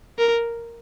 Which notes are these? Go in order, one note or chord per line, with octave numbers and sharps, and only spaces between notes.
A#4